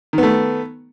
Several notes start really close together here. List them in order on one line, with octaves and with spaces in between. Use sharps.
D#3 B3 A3